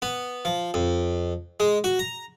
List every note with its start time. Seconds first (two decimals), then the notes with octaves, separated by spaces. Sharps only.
0.02 B3
0.45 F3
0.74 F2
1.60 G#3
1.84 F#4
1.99 A#5